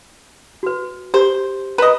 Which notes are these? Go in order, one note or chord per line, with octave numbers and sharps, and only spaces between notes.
F#4 B4
G4 C5
B4 D#5 A#5